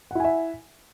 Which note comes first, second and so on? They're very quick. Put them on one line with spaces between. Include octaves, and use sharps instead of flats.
F#5 E4 G#5 E5